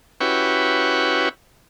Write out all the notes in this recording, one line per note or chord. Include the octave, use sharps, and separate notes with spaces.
C#4 E4 F#4 G4 B4